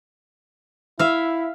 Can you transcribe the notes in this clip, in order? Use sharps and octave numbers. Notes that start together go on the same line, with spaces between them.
E4 E5 F5